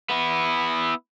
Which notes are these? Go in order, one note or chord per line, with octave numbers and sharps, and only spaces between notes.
B3 E4